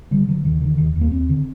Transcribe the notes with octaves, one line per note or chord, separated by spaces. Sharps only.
D3 G3
D3 F#3
D#2 D#3
D3 D#3
D#2 D#3
D#2
A#3
D#2 C4
D3